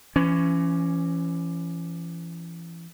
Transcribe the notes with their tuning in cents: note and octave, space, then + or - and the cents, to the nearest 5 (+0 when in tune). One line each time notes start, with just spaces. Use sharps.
E3 +35 C#4 +0